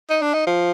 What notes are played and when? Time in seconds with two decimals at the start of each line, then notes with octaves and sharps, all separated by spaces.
0.10 D#4
0.22 D4
0.34 D#4
0.47 F3